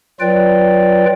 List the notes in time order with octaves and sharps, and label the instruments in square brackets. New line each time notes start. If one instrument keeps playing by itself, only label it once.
[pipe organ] F#3 F4 B4 D5 G5